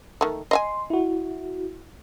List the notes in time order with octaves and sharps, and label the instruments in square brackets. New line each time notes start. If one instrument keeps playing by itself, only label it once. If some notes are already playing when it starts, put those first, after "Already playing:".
[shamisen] D#3 A3
[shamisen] D#5 E5 G#5 [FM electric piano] C6
[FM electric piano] E4 F#4